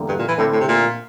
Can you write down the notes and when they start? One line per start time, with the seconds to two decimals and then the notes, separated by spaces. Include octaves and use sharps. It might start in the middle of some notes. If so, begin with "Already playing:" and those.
Already playing: E2 D3 G3 A#3
0.08 G2
0.18 A#2
0.28 E3
0.38 A2 D3 A3 C4 E4
0.52 A2
0.60 C3
0.68 A#2